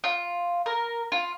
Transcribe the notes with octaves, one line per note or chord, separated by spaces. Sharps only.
F4
A#4
F4